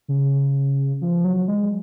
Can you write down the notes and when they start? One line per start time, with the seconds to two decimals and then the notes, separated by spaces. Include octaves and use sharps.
0.08 C#3
1.01 F3
1.24 F#3
1.48 G#3